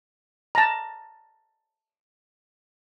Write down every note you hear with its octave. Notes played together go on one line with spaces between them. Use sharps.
A5 A#5